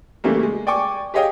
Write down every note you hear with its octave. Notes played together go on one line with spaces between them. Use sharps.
C#3 E3 G3 A3 A#3
G#3
D5 G5 G#5 C#6 D6
G4 G#4 C#5 D#5 F5 G5